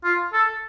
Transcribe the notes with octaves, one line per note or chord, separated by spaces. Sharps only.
F4
A4